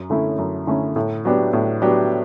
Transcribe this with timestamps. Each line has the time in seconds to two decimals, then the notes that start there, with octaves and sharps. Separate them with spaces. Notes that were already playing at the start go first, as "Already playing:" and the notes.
Already playing: F#2
0.10 D3 A3 C#4 E4
0.39 F#2
0.67 D3 A3 C#4 E4
0.96 A2
1.25 F#3 B3 D4 G4
1.53 A2
1.82 F#3 B3 D4 G4